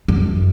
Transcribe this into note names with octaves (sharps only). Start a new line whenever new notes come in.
F#2